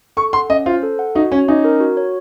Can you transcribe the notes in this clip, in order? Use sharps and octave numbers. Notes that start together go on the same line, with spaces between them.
A4 C#6
F#5 C6
C#4 D#5
F4 C5
A4
F#5
D#4 F#4
C#4 C#5
C#4 D#4
A#4
F#4
C#5